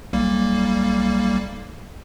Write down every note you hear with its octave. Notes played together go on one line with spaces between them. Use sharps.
B1 G3 A#3